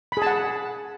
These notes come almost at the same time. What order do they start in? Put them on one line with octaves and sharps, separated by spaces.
B5 G#4 A5 F#5